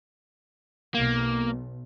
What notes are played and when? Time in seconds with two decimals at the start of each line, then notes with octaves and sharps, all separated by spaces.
0.94 B1 A#3